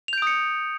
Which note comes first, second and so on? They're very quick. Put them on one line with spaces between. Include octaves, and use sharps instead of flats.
F7 G6 D7 D#6 C#7